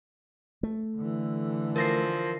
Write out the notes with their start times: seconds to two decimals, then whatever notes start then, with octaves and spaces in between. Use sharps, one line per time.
0.63 A3
0.97 D3 E3
1.76 F3 A#4 A#6 C7